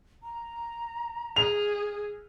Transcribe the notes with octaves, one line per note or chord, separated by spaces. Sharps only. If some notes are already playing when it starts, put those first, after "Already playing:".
A#5
G#4 F7